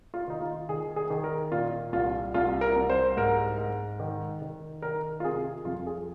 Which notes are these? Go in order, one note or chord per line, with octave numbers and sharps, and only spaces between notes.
F4
D#3 D#4
F4
D#3 G#4
G#4
D#3
A#4
A#2 F4
C2 F4
C2 F4
A#4
C2
C5
G#2 A#4
G#2
D#3
D#3
D#3 A#4
F4
C3 G#4
F2 F4
G#4